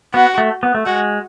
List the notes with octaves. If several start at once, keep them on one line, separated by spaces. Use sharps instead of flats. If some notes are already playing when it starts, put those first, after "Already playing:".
B3 F#4
A3
B3
A3
G#3 F#4